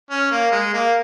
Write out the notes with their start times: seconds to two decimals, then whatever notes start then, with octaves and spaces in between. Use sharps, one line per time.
0.11 C#4
0.31 A#3
0.52 G#3
0.73 A#3